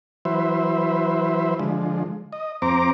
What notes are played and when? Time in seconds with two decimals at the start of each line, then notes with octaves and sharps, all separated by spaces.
0.25 E3 F#3 B4 C5 E5
1.59 D3 F3 G#3
2.32 D#5
2.62 F2 C4 C5 A#5 D6